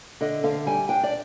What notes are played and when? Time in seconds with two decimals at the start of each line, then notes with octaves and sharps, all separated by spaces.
0.21 D3 D#5
0.44 D3 F5
0.66 G3 G#5
0.89 D4 G5
1.03 D5